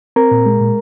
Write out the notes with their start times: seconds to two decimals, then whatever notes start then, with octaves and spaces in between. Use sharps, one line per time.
0.16 C4 A#4 A#5
0.31 A#2
0.46 G#3
0.60 A#2